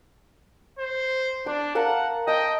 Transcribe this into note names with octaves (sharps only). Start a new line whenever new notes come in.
C5
D4 D6
A#4 F5 F#5 A5
D#5 G5 A5